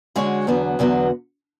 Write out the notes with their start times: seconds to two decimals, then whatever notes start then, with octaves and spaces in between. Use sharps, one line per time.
0.16 D3 G#3 C#4 F#4 C#5
0.47 E2 D3 F#3 B3 F#4
0.79 E2 D3 F#3 B3 F#4